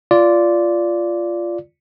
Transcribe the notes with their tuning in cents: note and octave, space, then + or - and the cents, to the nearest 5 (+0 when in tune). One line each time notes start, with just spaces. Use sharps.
F4 -10 D5 -10